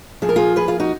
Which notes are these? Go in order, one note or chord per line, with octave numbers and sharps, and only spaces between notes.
A#2 F3 G#4
A#4
F4 G#4
G#4 B4
F4 G#4
D#4 F#4